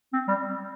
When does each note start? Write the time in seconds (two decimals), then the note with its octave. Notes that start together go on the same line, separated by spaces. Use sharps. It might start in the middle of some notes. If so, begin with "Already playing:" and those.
0.13 C4
0.28 G3